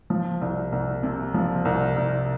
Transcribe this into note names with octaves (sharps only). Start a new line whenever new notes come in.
F3
C2
C2
C3
F3
C2
C2